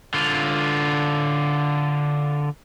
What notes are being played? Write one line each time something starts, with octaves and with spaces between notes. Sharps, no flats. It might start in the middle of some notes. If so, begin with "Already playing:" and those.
D3 F4